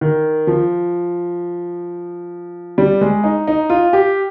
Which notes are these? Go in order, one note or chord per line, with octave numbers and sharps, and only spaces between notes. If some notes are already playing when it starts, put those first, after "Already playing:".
D#3
F3
G3
G#3
D#4
D#4
F4
G4